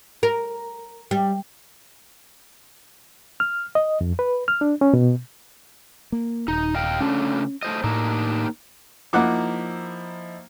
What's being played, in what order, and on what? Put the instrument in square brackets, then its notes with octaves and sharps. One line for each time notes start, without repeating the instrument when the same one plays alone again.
[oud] A#4
G3
[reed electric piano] F6
D#5
F2
B4
F6
D4
C#4
B2
[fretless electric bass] A#3
[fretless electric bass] D#1 [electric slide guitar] D#4
[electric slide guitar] D#5 F5 G5
[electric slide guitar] C#3 A3 D4 [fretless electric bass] C#4
[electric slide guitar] A3 C5 D#5
[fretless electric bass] A2 [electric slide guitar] A#3 D4 D#4
[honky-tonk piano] F3 D#4 E4 [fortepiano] A#3 F#5 D6